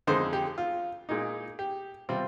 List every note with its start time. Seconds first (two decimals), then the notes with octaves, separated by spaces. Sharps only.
0.07 F2 D3 G#3 D#4 C5
0.33 G4
0.58 F4
1.09 A#2 G#3 D#4
1.59 G4
2.09 C3 G3 C4 F4